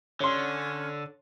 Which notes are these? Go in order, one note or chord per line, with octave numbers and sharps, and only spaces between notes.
D3 C#4 C#5 C6